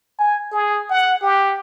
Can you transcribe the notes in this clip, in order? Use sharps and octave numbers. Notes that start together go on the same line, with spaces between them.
G#5
G#4
F#5
G4